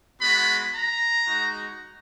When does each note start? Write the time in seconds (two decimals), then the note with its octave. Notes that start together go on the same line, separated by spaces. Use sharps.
0.22 G#3 B3 F#4 B5
0.75 A#5
1.27 G#3 D#4 F#4